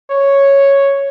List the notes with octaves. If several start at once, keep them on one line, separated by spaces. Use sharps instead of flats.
C#5